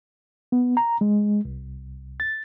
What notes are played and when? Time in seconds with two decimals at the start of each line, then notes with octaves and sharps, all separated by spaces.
0.52 B3
0.77 A#5
1.01 G#3
1.45 C2
2.20 A6